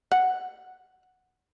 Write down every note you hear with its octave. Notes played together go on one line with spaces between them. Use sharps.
F#5